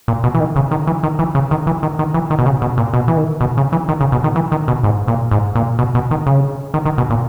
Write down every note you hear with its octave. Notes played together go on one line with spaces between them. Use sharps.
A#2
B2
E3
D#3
C#3
D#3
E3
D#3
E3
C#3
D#3
E3
D#3
D#3
E3
D#3
B2
C#3
B2
A#2
B2
E3
D#3
B2
C#3
E3
D#3
C#3
B2
D#3
E3
D#3
B2
G#2
A#2
G#2
A#2
B2
B2
D#3
C#3
D#3
D#3
B2
A#2